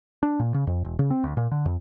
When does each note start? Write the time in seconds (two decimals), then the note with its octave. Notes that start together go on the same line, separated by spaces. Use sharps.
0.23 D4
0.40 A#2
0.54 C#3
0.67 F2
0.85 E1
0.99 C#3
1.11 C4
1.24 D2
1.37 A#2
1.51 D3
1.66 F2